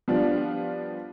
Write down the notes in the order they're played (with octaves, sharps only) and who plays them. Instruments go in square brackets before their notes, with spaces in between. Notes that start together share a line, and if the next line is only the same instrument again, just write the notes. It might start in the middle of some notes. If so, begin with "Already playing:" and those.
[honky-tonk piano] F3 G3 B3 D4 F4